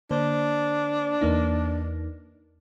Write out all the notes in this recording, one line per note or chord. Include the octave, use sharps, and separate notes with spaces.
D3 A#3 D4 C5
E2 A#3 D#4